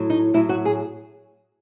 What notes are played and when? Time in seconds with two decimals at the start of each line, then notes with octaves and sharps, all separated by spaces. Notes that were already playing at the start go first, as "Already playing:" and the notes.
Already playing: A2 F#3
0.10 D#4
0.34 A2 F#3 E4
0.49 F#4
0.65 G#4